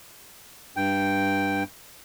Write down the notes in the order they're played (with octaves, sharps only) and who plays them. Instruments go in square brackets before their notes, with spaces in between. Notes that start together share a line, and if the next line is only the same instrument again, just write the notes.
[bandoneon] G2 G5